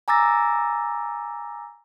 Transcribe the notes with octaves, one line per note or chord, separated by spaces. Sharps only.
G#5 A#5 D6 E6 A6 A#6